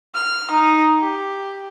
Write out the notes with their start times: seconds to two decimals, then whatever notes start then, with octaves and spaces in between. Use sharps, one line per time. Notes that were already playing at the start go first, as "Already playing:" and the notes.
0.15 F6
0.51 D#4
0.99 G4